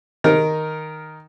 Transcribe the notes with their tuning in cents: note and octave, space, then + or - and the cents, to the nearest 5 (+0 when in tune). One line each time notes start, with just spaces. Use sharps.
D#3 +0 D#4 +0 A#4 +0